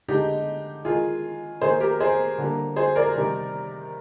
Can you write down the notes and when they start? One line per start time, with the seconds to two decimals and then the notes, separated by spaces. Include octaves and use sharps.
0.08 D3 G#3 D#4 G4
0.85 D#3 G#3 F4 G#4
1.62 D#3 A#3 G#4 C5
1.80 G4 A#4
2.00 G#4 C5
2.38 D3 G3 A#3
2.76 G#4 C5
2.96 A#4 D5
3.15 C3 D#3 G3